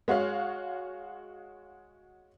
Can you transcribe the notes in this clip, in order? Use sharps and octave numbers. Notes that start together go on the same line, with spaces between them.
G#3 F#4 C#5 F5